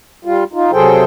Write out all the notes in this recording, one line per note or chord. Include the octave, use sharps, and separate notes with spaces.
G3 F4
D#4 F4
C3 F#3 G#4 A4 C5 G5